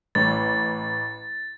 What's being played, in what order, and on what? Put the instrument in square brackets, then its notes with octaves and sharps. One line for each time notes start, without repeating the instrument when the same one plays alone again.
[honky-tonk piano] A1 [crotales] A6